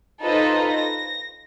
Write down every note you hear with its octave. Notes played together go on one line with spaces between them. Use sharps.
D#4 F4 A4 B4 C5 D#5
A#6